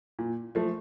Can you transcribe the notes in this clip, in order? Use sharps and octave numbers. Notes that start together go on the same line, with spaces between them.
A#2
F3 A3